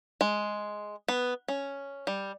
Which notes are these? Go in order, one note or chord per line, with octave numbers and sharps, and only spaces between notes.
G#3
B3
C#4
G3